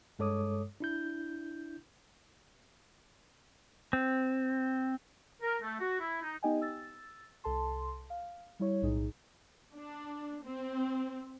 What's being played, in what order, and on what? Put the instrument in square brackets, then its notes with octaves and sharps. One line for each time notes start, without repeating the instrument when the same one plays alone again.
[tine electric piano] G2 G#3 A4 C#5 D6 D#6
D4 E4 G6
[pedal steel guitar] C4
[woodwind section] A#4
A3
F#4
E4
D#4
[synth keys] B3 D#4 G4 D#5 G5 G#5
E6 A6
C2 A4 A5 C6
F5
G3 E4 C#5
B1 A2 D#4 G#4
[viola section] D4
C4